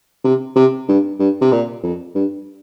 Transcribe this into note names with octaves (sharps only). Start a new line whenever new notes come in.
C3
C3
G2
G2
C3
A#2
F2
G2